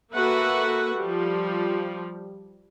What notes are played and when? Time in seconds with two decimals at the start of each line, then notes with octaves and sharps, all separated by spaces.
0.13 A#3 F#4 A4 B4 E5 F#5
0.96 F3 G3